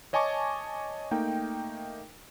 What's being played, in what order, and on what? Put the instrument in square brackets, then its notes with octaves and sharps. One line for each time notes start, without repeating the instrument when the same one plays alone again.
[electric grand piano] C#5 D#5 G#5 A5 C#6 D6
A3 A#3 D#4 G5